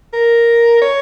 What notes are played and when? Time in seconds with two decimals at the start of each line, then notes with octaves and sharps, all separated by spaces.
0.13 A#4
0.82 C#5